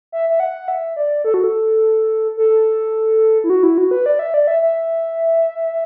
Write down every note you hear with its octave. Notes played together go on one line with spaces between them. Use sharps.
E5
E5
F#5
E5
D5
A4
F#4
A4
A4
E4
F#4
E4
F#4
B4
D5
E5
D5
E5
E5